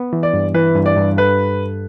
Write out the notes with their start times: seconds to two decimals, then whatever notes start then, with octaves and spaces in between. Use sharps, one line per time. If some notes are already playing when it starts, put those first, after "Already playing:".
Already playing: B3
0.13 E3
0.23 D5
0.34 G2
0.54 E3 B4
0.75 G2
0.86 D5
0.96 G2
1.17 A4 B4